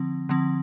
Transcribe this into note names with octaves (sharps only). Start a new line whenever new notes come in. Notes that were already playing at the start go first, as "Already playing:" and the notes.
Already playing: D3 F3 C4
D3 F3 C4